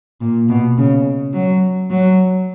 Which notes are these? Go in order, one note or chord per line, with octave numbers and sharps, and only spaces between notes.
A#2
B2
C#3
F#3
F#3